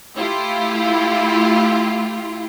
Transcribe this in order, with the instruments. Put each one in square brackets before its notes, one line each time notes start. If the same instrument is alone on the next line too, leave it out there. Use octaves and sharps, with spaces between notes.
[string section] A3 E4 F4 G4